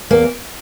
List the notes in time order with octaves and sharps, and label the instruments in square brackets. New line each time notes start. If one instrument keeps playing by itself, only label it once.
[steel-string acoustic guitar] E2 A#3